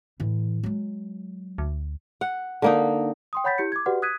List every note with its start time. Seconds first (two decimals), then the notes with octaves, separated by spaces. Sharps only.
0.20 A2 E3
0.63 F#3 G#3
1.58 D2
2.21 F#5
2.62 D3 A#3 D#4
3.33 G5 C6 D#6
3.44 C#5 F#5 B5 G6 A6 B6
3.58 E4 G4 G6 C#7
3.72 D6 G#6
3.86 F#4 G4 B4 D5 F#5
4.02 D#6 F#6 G#6 B6 D#7